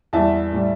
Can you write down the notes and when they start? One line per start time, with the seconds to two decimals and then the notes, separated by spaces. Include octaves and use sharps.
0.13 E2 E3 G3 E5 A5
0.53 A2 G3